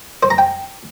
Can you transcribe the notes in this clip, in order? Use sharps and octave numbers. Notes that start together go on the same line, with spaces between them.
C5
A#5
G5